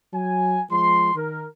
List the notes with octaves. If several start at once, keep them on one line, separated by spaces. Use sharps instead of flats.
F#3 G#5
F3 G#3 C6
D#3 A#4